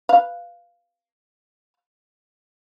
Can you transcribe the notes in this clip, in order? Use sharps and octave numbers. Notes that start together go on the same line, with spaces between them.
B4 F5